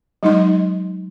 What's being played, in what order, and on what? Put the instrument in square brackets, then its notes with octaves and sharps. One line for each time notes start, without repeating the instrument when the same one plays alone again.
[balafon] F#3 G#3 D#4 D#5 C6